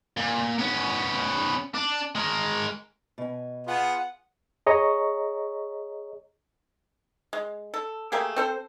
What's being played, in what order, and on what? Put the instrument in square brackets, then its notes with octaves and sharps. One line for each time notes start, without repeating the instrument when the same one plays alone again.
[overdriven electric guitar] A#2
B3 C#4
D4
G#3 A#4
[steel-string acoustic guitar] B2 G#5
[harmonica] B3 G#4 [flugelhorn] F4 [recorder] F#5
[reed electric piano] G#4 C#5 D#5 A#5 C#6
[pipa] G#3
A4
A3 A#3 G4 G#4
C4 A4 C5